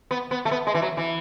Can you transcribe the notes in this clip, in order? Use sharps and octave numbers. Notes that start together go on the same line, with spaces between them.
B3
B3
A3
B3
G#3
E3
F#3
E3